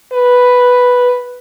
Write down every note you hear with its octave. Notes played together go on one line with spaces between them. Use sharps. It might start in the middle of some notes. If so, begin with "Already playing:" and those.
B4